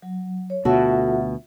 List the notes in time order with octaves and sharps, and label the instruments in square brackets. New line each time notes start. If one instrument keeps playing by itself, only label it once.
[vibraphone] F#3
C#5
[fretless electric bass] D2 B2 [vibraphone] F4 E5 F#5 [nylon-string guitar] F#4 A4